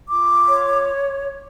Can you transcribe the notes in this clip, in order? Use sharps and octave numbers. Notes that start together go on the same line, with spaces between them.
F4 D6
C#5